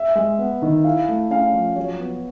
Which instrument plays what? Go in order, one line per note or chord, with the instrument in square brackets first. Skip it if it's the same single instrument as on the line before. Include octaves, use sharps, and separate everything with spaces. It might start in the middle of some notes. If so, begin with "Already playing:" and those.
Already playing: [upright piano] E5
[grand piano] G#3
B3
D#3
[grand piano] E4 [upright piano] F5
[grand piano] A3
[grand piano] C#4 [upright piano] F5
[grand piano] F3
[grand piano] F#3 [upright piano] C#5
[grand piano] B3